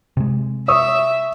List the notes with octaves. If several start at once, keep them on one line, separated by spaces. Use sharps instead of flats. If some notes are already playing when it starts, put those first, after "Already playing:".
C3 G#3
E5 C#6 D#6 E6